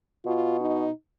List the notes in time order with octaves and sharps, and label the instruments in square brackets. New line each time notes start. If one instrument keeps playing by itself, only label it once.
[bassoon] B2 [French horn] F4
[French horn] D#4